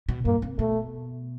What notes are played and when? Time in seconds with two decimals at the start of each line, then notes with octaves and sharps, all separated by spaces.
0.09 B2
0.25 G2 A#3
0.42 C3
0.58 B2 A3